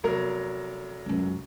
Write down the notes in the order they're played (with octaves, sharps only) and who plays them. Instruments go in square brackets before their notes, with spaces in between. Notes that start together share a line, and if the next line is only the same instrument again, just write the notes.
[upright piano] F1 F#3 A#4 [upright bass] B3
[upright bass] C#2 F#2